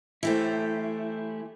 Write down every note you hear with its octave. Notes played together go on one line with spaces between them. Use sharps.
E3 A3 E4 G4 C5